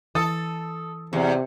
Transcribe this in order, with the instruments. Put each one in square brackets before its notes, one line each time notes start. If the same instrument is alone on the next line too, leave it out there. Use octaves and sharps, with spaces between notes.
[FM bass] E3 [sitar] A4 [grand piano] D#6 A6
[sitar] E2 [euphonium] C3